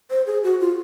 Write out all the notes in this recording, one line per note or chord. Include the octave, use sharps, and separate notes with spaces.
C5
G#4
F#4
F4